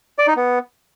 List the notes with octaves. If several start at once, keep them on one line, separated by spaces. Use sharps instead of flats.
D5
D#4
B3